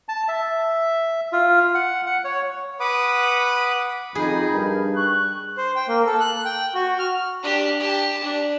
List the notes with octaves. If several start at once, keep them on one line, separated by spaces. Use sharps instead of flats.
A5
E5
F4
F#5
F#5
C#5
B4 F#5 B5 D6 D#6
F2 D#4 G#4 B5 G6
G2 A#4
C#6 F#6
C5
G5
A#3
A4
F#6
G5
F#4
F6
D4 G4
G4 A5
D4